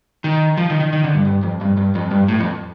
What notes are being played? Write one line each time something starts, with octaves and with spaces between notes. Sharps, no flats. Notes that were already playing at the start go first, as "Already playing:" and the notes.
D#3
F3
D#3
D#3
D#3
D3
G2
G2
F2
G2
G2
F2
G2
A2
F2